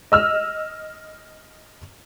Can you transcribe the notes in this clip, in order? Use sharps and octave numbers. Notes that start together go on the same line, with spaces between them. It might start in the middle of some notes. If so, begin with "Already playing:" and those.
D#5 E6 F6